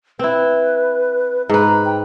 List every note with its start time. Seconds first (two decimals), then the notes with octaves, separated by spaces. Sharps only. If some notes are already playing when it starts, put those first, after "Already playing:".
0.19 C4 E4 B4
1.49 G#2 B4 A#5
1.85 G5